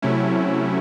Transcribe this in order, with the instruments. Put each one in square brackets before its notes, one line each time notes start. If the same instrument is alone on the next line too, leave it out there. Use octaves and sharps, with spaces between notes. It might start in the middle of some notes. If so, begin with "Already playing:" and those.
[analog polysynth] C3 F#3 A3 C#4 E4